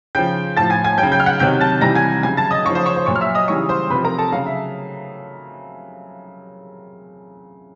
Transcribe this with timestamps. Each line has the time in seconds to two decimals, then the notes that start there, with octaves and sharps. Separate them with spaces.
0.15 C#3 F3 G5 G6
0.57 A2 A5 A6
0.61 F3
0.70 G#5 G#6
0.84 G#5 G#6
0.98 F#3 G5 G6
1.03 C#3
1.12 G5 G6
1.20 F6
1.26 F#5 F#6
1.39 C3 D#3 F#3 G5 G6
1.61 A5 A6
1.81 C3 E3 G3 A#5 A#6
1.95 G#5 G#6
2.23 C#3 F#3 G#5 G#6
2.37 A5 A6
2.51 D#5 D#6
2.65 C#3 C#5 C#6
2.70 F3
2.75 C5 C6
2.85 C#5 C#6
2.96 C5 C6
3.06 A#2 F#3 C#5 C#6
3.16 F6
3.21 E5 E6
3.35 D#5 D#6
3.48 C#3 E3 G3 C#5 C#6
3.69 C5 C6
3.90 C3 B4 B5
3.95 F3
4.04 A#4 A#5
4.18 A4 A5
4.32 C#3 F#3 F5
4.46 E5